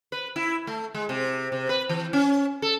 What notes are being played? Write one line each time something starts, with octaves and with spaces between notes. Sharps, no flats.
B4
E4
A3
G#3
C3
C3
B4
E3
C#4
A4